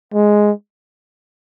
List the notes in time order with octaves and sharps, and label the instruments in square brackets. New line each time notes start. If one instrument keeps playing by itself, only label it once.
[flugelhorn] G#3